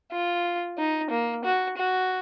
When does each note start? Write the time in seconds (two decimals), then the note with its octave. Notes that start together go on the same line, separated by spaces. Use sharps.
0.12 F4
0.78 D#4
1.10 A#3
1.44 F#4
1.77 F#4